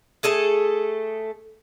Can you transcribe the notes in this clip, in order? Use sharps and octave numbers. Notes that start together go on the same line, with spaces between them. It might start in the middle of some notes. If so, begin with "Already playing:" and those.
A3 G#4 A4 A5